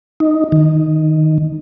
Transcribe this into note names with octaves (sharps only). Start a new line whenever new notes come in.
D#4
D#3